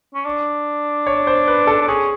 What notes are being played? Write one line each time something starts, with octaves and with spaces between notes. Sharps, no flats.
C#4
D4
C#5
C5
B4
A4
D4
C#4 G#4